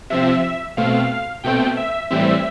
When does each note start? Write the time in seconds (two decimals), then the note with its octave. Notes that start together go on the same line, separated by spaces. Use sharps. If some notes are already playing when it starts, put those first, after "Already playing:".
0.10 C3 F3 C4 E5
0.77 B2 A3 C4 F5
1.44 B2 A3 C4 G5
1.77 E5
2.11 A2 E3 G3 C4 E5